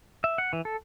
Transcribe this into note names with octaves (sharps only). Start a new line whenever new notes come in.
E5
F#5
E3
A4